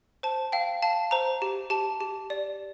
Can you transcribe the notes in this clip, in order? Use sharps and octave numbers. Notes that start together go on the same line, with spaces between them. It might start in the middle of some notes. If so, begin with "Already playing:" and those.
C5 A5
F5 G5
F5 A5
C5 A#5
G4
G4 A5
G4
D5